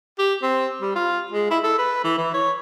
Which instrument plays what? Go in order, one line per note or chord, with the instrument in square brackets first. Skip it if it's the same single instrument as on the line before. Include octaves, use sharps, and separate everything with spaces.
[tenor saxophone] G4
C4
G3
F4
G#3
E4
A4
B4
E3
E3
C#5